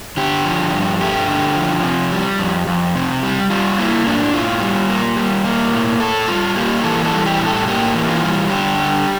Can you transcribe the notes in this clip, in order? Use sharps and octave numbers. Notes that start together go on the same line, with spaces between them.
D3 G4
F3
G2
A3 G4
D3
F3
C3
G3
F2
F2
C3
G3
G3 F4
A#3 E4
A2 D4
A2 F4
G3
A#3
G3
A#3
A2
A2 A4
G3 F4
A#3 G4
E3 A4
A4
G3
G4
A2
A4
A#3 G4
E3
F4
G3
D3 G4
G3